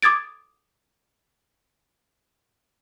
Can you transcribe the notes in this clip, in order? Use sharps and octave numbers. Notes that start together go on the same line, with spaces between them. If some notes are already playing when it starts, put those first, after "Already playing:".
D6 D#6 G#6 A6 D7